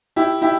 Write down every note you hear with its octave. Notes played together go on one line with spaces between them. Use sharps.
E4 G4
E4 G4